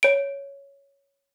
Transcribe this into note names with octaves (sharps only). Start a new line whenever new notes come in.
C#5 D7